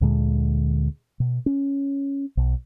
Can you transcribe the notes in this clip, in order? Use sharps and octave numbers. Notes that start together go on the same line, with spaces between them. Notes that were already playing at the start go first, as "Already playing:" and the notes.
D2 A#2 D3 G#3
B2
C#4
B1